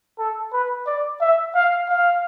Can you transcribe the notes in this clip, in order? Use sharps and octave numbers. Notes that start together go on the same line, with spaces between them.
A4
B4
D5
E5
F5
F5